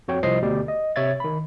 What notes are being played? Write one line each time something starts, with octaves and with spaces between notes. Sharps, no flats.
F2 F#4 C#5 G5
C2 F3 C5 D#5 C7
D2 B2 G4 D5
D#5
C3 C#5 E5 G#6 A6
D#3 B5